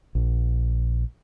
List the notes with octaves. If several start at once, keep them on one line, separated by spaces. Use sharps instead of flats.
A#1